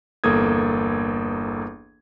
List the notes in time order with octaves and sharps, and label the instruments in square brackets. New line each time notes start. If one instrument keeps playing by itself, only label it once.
[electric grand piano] G1 E2 A#3 A4 D#6 G#6